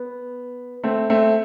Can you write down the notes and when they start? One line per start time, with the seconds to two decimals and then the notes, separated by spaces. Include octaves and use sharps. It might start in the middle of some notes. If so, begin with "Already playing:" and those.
Already playing: B3
0.84 A3 C4
1.10 A3 C4